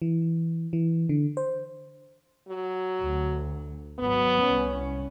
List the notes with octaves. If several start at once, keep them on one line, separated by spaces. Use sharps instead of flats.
E3
E3
D3
C5
F#3
D2
G#1 F#3 B3
C2 C#4